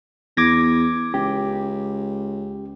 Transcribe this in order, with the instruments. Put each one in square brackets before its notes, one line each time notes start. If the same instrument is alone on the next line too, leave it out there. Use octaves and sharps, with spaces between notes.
[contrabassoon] E2 [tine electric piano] D6 G#6 A#6
[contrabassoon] C#2 [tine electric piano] G4